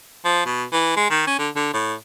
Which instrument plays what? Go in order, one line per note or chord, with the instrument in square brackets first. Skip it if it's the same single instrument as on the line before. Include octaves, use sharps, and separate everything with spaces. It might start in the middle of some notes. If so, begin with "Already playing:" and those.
[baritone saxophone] F3
B2
E3
G#3
D#3
C#4
D3
D3
A2